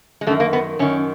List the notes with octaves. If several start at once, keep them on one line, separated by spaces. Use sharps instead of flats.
G#3
F#2 D#3 A3
A#3
B3
F#2 D#3 C#4